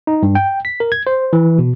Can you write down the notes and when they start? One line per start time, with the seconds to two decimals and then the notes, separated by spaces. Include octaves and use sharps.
0.07 D#4
0.23 G2
0.35 G5
0.65 B6
0.80 A#4
0.92 G#6
1.07 C5
1.33 E3
1.59 B2